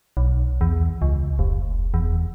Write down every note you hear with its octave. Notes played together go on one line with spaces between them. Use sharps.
B1
E2
C#2
F1
E2